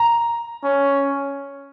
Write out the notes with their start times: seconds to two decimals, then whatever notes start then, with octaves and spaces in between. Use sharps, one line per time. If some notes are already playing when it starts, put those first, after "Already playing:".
Already playing: A#5
0.64 C#4